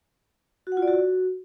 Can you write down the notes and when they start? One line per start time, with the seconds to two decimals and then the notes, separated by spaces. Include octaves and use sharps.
0.67 F#4
0.72 F#5
0.77 F4
0.82 D5
0.88 F#4